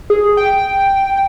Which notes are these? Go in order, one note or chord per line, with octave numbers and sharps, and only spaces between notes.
G#4
G5